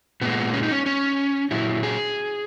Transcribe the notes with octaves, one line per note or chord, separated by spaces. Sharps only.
A#2 G#3 B3
C#4
D#4
C#4
C#4
A#2 F#3 E4
G#4